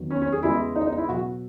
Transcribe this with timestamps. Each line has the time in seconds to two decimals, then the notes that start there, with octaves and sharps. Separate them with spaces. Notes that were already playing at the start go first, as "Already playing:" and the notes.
Already playing: E2 D#3 F#3
0.11 C#4
0.22 C#4
0.32 G#4
0.43 E2 C#3 G#3 E4
0.76 D#4
0.87 D#4
0.98 E4
1.09 B2 F#3 F#4